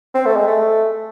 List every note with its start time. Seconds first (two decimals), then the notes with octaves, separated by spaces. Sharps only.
0.15 C4
0.26 A3
0.36 G#3
0.47 A3